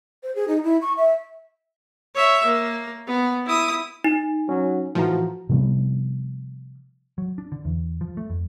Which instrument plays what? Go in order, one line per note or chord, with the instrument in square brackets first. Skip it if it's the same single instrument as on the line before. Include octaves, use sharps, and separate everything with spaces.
[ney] C5
G#4
D#4
E4
C#6
E5
[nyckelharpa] C#5 E5
A#3
B3
E4 D#6
[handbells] D#4
[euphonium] F#3 [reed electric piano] C#4
[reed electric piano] A2 E3 A#5 [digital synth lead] F3 [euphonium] F#4
[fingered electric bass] C3 F3 G3 B3
[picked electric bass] F#3
D4
D3
E2
F3
A3
F2